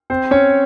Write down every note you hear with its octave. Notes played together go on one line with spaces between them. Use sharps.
C4 C5
C#4 C#5